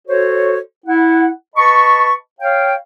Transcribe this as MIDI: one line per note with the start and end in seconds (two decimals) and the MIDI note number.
0.08 0.58 66
0.08 0.58 69
0.08 0.58 72
0.08 0.58 73
0.86 1.29 64
0.86 1.29 78
1.56 2.13 71
1.56 2.13 75
1.56 2.13 81
1.56 2.13 83
1.56 2.13 85
2.40 2.74 73
2.40 2.74 77
2.40 2.74 79